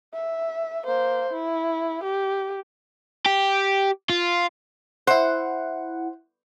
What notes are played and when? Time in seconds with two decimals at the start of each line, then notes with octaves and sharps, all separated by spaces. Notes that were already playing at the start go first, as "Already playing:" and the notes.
0.13 E5
0.85 A#3 C5
1.33 E4
2.03 G4
3.26 G4
4.09 F4
5.07 E4 C5 F#5